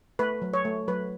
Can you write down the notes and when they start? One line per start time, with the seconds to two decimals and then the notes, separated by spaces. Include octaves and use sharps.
0.19 A3 B4
0.42 F#3
0.54 C#5
0.65 A3
0.88 F#3 B4